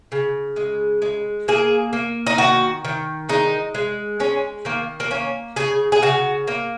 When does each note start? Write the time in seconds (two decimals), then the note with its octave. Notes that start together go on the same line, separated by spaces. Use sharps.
0.12 C#3
0.56 G#3
1.02 G#3
1.48 A#3 G#4
1.93 A#3
2.27 D#4
2.38 D#3 F#4
2.85 D#3
3.29 G#3 D#4
3.75 G#3
4.20 G#3 C#4
4.65 D#3 A#3
5.00 A#3
5.11 A#3 C#4
5.56 C#3 G#4
5.92 G#4
6.02 C#3 F#4
6.47 A#3